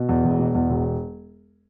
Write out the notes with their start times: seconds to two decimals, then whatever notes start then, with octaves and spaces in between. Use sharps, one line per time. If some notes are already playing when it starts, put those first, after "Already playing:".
Already playing: B2
0.09 E2
0.24 E1
0.39 B2
0.55 E2
0.70 E1